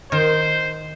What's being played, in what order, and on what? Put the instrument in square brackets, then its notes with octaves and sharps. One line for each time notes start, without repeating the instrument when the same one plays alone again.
[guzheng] D#3 [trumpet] C5